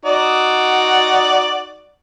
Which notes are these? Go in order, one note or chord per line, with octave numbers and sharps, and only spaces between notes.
D#4 F#4 D5